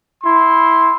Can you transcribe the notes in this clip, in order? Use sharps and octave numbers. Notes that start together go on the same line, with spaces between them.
E4 C6